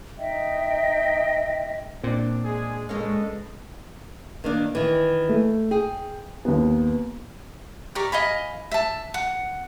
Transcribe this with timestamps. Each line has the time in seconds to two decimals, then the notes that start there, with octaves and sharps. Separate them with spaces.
0.18 D#4 D#5 E5 G5
2.03 A#2 C4 D4
2.45 G#3 G#4
2.89 G#3 A#3 C#4 A4 B4 D#5
4.44 D#3 A#3 D4
4.75 D#3 E3
5.29 A3
5.71 G#4 G5
6.45 D#2 B3
7.95 G4 A#4 D5 C#6
8.12 D#5 F5 G#5 B5
8.71 E5 A5
9.14 F#5